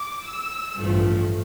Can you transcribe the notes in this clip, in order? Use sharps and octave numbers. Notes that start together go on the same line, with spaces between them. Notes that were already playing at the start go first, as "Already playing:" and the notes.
Already playing: D6
E6
A1 G2 F3 A3